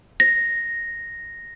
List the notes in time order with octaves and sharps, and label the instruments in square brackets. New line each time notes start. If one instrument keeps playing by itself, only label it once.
[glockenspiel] A#6